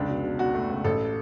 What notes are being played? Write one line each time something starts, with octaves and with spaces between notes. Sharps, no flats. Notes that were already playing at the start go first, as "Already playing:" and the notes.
Already playing: F1 C#2 D4
B2
B2
B2 F#4
A3
C#2
A1 A4